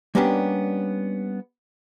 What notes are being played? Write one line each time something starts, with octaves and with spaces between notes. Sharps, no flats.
G3 A#3 B3 C#4 D4 G4